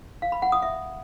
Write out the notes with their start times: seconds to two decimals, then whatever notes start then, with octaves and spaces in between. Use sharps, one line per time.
0.22 F5
0.32 B5
0.42 F#5
0.52 D#6
0.62 E5